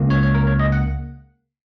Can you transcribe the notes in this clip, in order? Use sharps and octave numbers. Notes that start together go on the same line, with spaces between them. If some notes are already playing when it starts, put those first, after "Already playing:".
Already playing: C#2 C#3 A#3
C#5
C#5
A#4
C#5
D#5
F#5